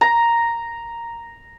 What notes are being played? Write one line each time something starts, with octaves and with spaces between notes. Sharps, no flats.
A#5